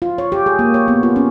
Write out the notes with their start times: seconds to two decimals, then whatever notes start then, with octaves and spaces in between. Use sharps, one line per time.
0.02 F4
0.18 C#5
0.32 G4
0.46 G#4
0.59 A#3
0.74 C#5
0.88 B3
1.03 F4
1.16 C#4